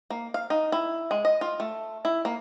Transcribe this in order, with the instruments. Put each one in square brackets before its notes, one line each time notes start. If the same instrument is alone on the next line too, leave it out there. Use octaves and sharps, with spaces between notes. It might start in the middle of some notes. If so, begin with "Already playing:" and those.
[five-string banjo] A#3
F5
D#4
E4
G#3
D#5
F4
A3
E4
A#3